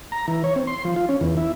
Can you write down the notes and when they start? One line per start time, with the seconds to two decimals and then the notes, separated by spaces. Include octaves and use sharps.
0.12 A#5
0.28 E3
0.44 C#5
0.56 C4
0.67 C6
0.85 F3
0.96 F4
1.09 C#4
1.21 E2
1.37 E4